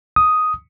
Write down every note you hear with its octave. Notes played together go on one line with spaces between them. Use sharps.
D#6